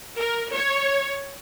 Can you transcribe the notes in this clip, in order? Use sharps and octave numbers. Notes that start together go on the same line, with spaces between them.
A#4
C#5